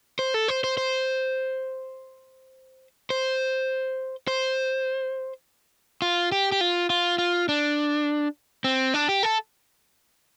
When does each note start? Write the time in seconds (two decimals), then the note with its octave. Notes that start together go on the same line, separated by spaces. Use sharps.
0.19 C5
0.34 A4
0.48 C5
0.64 C5
0.77 C5
3.10 C5
4.28 C5
6.02 F4
6.32 G4
6.52 G4
6.61 F4
6.90 F4
7.18 F4
7.49 D4
8.64 C4
8.94 D4
9.09 G4
9.23 A4